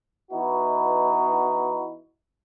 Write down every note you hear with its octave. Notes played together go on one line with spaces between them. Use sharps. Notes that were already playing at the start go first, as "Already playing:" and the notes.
E3 B3 D#4 E4 F#4